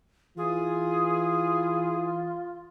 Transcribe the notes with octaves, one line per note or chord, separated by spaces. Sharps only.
E3 F4 G#4